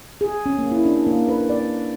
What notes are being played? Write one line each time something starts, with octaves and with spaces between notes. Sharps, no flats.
G#4
C#4
A#3
E4
D4
A#3
B4
D5